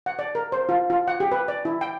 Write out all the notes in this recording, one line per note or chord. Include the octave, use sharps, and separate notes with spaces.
F#5
D5
A#4
C5
F4
F4
F#5
G4
B4
D5
E4
G5